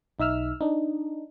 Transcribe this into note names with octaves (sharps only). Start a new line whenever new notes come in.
B1 D#4 E5 E6 F6
D4 D#4